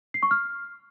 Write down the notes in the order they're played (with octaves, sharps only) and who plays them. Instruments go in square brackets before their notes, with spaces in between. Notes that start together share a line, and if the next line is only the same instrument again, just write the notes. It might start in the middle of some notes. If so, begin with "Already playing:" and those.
[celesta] C7
C#6
F6